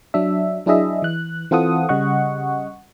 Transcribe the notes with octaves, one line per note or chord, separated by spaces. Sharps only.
F#3 D4 E5
F#3 D4 E4 G#4 D#5 E5
E3 F#6
E3 C4 F4 A4 F#5 D#6
C#3 G3 D#5 F#5 C#6